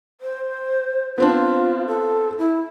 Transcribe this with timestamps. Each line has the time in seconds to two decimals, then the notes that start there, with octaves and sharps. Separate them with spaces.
0.21 C5
1.18 B3 C4 D4 F4
1.87 A4
2.38 E4